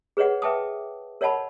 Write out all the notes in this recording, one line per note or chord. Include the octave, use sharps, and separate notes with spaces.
G#4 B4 C#5 D#5 F#5
B4 E5 G5 A5 D6 D#6
A#4 C#5 D#5 F#5 A5 B5